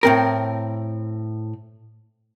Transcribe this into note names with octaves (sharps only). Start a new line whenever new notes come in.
A2 C4 A#4